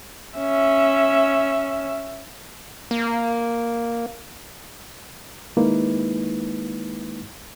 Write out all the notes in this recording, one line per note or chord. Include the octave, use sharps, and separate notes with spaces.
C#4 E5
A#3
D#3 G#3 A#3 D#4 E4 B4